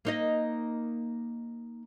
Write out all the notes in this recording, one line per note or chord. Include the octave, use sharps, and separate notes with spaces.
A#3 D#4 D#5